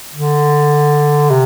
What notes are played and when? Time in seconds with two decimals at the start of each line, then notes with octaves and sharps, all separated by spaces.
0.14 D3
1.30 C3